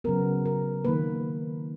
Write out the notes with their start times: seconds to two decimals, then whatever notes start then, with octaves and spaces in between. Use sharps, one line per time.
0.04 C#3 F#3 B3 A#4
0.46 A#4
0.85 D#3 A#3 B4